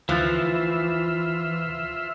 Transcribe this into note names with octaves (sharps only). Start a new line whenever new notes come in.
D2 E3 F3 F4 E5 F#6 A6